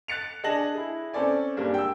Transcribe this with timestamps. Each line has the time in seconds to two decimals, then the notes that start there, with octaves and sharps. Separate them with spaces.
0.08 F#6 A6 C#7 F7
0.43 D4 G#4 D#5 A5 A#6 F#7
0.75 E4 G#4
1.13 C4 C#4 A4 D5 G#5
1.57 G2 G3 G#3 A#3 D4
1.74 G5 E6